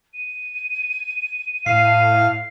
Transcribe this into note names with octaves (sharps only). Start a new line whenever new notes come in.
D#7
A2 F5 C7